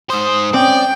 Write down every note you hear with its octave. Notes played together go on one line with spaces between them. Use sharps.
G#2 C5 D#6
C4 C#4 D5 G5